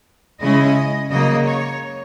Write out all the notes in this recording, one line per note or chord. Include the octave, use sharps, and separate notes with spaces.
C#3 G#3 C#4 E4 D#5
C#3 F#3 A#3 D#5
C#5